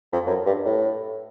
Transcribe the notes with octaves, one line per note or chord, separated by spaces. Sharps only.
F2
F#2
G2
A2